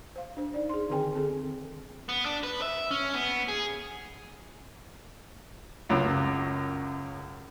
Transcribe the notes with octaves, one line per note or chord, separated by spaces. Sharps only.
C5 F5
D4 C5
D#4 D5
G#4 C6
D3 D#3 C4 G#4 G5 G#5
C4 G#4 A4
B3
D4
B4
E5
C#4
B3
G#4
C#2 F#2 C#3